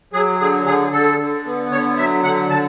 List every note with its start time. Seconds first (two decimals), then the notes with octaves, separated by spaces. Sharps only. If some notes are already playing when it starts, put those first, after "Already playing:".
0.13 F#3 G#4
0.40 D3 G#4
0.66 D3 G#4
0.92 D3 A4
1.19 D3
1.46 B3
1.71 D3 C#5
1.97 F#3 E5
2.24 D3 F#5
2.50 D3 A5